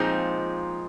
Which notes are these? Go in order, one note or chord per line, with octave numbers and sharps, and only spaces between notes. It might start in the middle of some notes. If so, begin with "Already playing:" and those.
Already playing: A#2 F3 G#3 C4 D#4